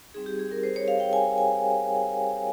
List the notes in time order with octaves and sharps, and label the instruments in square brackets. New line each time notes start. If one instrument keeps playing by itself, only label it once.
[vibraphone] G3 C4 D#4 G#4
G4
G#4
A#4
C5
C#5
F5
G5
G#5
G#5